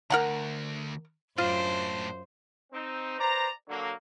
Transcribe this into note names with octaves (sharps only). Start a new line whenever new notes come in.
D2 A#4 F#5 A#5
F#2 A2 D4 F4 C5
C4 D#4
B4 C5 D5 A#5
D3 F#3 A#3